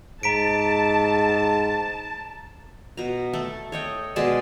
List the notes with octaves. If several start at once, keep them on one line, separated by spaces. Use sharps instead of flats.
G#2 A5 A#5 B6 D7
B2 A#5
A3 A4
C#5 D#5 G5
B2 G#3 D5 A5